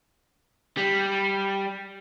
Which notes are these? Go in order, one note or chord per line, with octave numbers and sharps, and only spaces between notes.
G3